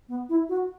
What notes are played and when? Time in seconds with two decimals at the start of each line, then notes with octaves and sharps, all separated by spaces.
0.08 B3
0.29 E4
0.49 F#4